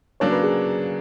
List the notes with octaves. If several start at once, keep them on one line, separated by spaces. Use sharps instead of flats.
C#3 F#3 A#3 D4 C#5
B4
G#4